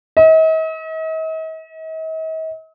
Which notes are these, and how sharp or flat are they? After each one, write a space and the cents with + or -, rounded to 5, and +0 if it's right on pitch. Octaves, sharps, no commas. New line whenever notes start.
D#5 +45